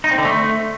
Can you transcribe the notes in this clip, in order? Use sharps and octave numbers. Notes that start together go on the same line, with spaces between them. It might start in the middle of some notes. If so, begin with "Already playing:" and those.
D#4
C4
D3
A3